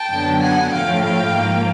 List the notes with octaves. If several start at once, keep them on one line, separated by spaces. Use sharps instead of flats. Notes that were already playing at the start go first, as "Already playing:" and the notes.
Already playing: G5 A5
F#2 D3 F#3 B3
F#5 G#5
A2 F3 A3 F5 G5
F5 G5
G#2 F3 A#3